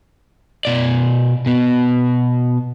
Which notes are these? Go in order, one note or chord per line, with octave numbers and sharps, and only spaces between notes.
B2 D5
B2 B3